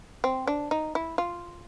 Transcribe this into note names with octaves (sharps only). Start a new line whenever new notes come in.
C4
D4
D#4
E4
F4